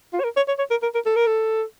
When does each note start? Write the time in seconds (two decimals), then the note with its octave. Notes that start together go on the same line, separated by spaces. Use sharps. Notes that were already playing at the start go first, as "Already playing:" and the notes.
0.13 F4
0.20 C#5
0.24 A#4
0.36 C#5
0.48 C#5
0.58 C#5
0.70 A#4
0.82 A#4
0.94 A#4
1.05 A4
1.16 A#4
1.26 A4